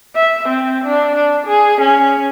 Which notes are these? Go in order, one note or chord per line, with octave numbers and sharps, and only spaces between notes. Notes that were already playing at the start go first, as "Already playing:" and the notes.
E5
C4
D4
D4
G#4
C#4